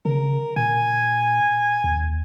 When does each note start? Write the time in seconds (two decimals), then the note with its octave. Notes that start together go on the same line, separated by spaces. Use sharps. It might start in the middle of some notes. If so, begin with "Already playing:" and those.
0.05 C#3 A#4
0.56 A#2 G#5
1.84 D#2